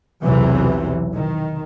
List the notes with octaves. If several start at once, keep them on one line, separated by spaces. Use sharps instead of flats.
B1 E2 C3 E3 F#3
D#3